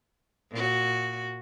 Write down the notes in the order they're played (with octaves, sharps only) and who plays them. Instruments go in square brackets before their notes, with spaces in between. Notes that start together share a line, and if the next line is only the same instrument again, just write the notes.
[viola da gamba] A#2 F#4